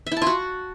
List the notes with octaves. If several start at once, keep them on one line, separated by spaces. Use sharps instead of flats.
E5
E4
A5
F4
F#4